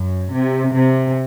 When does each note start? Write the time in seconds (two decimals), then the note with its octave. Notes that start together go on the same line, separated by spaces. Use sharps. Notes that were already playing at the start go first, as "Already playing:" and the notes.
Already playing: F#2
0.33 C3
0.75 C3